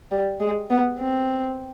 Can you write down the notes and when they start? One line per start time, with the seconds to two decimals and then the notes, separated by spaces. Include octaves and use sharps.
0.11 G3
0.40 G#3
0.70 B3
0.99 C4